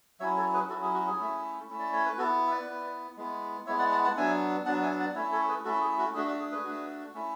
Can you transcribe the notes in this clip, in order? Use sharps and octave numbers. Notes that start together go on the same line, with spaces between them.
F#3 C#4 E4 C#5 E5
A4 C#5
G#4 B4
F#3 C#4 E4 F#4 A4
G#4
F#4
G#4
A3 C#4 E4
A3 C#4 E4
D5
C#5
B4
B3 E4 F#4 A4
E5
B4 D5
B3 E4
G#3 B3 E4
G#3 B3 E4 C#5 E5
D5 F#5
F#5 A5
F#5 A5
F#3 B3 D4 E5 G#5
F#3 B3 D4 F#5 A5
E5 G#5
D5 F#5
A3 C#4 E4 C#5 E5
A4 C#5
G#4 B4
A3 C#4 E4 F#4 A4
G#4
F#4
A3 D4 F#4 G#4
F#4
G#4
G#4 B4
A3 D4 F#4
A3 C#4 E4